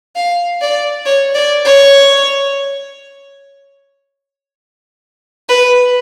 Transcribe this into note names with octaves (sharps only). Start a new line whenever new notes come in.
F5
D5
C#5
D5
C#5
B4